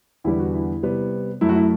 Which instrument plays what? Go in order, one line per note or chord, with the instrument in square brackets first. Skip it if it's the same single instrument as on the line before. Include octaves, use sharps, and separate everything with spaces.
[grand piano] E2 D3 G3 B3 E4
F#4
E4
C3 G3 B3
F#2 F#3 A3 E4
F#4
E4